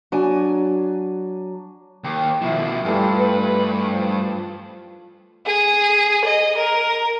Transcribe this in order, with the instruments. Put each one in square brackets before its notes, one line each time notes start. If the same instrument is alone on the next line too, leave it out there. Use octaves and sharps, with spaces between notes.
[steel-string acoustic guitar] F#3 D4 G#5
[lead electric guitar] D#2 [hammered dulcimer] G4
[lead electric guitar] B2 F3 [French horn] E4
[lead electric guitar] G2 [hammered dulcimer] E3 A3 F4 [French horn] G3
[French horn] B4
F3
[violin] G#4
D#5
A#4